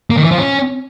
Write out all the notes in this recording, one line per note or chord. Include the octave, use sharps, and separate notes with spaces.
A#3
D#3
E3
F3
C#4